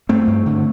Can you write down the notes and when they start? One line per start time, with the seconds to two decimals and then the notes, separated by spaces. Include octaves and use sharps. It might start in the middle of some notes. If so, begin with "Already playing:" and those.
0.09 G2 A3 C4
0.27 G2
0.46 D3